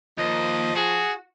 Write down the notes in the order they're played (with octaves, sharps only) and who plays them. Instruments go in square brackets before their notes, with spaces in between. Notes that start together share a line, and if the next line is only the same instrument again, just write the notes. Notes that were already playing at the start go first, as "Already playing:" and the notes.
[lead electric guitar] D#2 [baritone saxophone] F3 [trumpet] D#5
[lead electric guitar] F#4 [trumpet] G#4